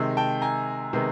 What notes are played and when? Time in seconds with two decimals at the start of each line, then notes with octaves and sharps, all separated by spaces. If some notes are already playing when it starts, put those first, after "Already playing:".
Already playing: C3 D#3 G#3
0.17 G5 A5
0.42 G#5 A#5
0.93 C3 D#3 G#3 B3